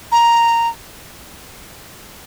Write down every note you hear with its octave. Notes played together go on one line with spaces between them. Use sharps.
A#5